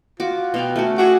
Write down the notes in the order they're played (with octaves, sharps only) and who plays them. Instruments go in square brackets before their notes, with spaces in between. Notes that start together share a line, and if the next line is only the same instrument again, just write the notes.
[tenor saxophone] F4 [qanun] F#4 D6
[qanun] B2 F5 G5
A3 C#4 F#4
[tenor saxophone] F#4 [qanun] G#4 E5 D6